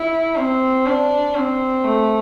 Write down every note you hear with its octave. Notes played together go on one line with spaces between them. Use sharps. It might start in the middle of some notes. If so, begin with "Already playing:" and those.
Already playing: E4
C4
D4
C4
A3